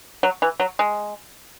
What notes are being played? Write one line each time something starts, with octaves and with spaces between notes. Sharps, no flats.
F#3
E3
F#3
G#3